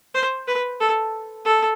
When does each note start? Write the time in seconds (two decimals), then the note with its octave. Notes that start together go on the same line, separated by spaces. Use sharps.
0.14 C5
0.47 B4
0.80 A4
1.45 A4